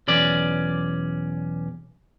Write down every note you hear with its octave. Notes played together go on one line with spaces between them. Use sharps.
B1 E2 C#4 D5